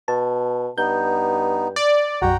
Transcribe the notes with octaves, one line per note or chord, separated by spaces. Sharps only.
B2 A5
G2 B3 D#4 G6
D5
B1 F#2 F#4 F#5 G5 A#5